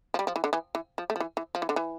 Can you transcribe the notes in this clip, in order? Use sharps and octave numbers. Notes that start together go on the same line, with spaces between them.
F3
G3
F3
E3
D3
E3
E3
F3
A3
F3
E3
E3
F3
E3
D3
E3